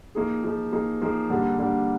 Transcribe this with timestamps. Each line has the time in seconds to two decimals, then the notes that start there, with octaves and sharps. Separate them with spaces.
0.15 F3 A#3 D#4 G#4
0.44 F3 A#3 D#4 G#4
0.72 F3 A#3 D#4 G#4
1.02 F3 A#3 D#4 G#4
1.30 D3 G3 A#3 D4
1.59 D3 G3 A#3 D4